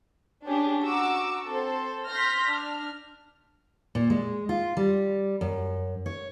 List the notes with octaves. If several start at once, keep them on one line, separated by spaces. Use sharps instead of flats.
C#4 D4 G4 G#4
F#4 A#5 C#6 D6 E6
C4 A4 C5
C6 F6 G6 A#6 B6
D4 F6
A#2
G#3
F4
G3
F#2
C#5